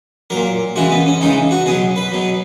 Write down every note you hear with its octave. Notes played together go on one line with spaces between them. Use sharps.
A#2 F#3 A#4
C#3 E3 G#3 F#4
B3
C#4
C#3 E3 G#3 D#4
F#4
B2 F#3 G#4
B4
B2 F#3